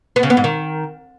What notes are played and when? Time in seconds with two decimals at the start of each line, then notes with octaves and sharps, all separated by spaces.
0.16 B3
0.23 C#3
0.30 B3
0.37 G#2
0.44 D#3